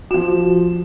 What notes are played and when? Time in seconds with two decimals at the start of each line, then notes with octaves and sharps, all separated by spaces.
0.11 F3 F#4 E7